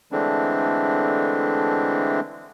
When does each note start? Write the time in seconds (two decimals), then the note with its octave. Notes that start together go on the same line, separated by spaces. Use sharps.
0.12 D3 E3 G#3 A3 C4 D4